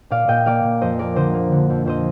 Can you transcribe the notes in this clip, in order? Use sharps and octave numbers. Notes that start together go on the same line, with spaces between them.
A#2 D5 F5
A#2 D#5 G5
A#3 D5 F5
A#2
F2 C5 D#5
A#3 A#4 D5
D3 C5 D#5
A#3
D3
F2
F2 C5 D#5